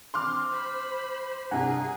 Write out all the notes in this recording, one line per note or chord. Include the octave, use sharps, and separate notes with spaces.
C4 C6 D6 F6
C5 B5
C2 G2 G#4 F#5 G#5 A#5